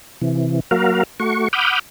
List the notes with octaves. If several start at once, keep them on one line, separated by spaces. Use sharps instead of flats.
C3 E3
F#3 A#3 F#4 A#4 F5
A3 F#4 C#6
F#5 B5 D6 D#6 F6 G6